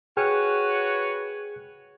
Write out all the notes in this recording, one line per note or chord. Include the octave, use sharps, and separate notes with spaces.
F#4 G#4 B4 C#5 G5 F6